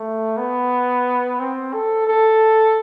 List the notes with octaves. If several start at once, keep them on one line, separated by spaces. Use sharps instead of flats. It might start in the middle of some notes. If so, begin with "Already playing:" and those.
Already playing: A3
B3
C4
A4
A4